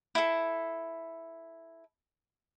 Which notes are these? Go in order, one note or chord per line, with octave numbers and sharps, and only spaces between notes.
E4 A4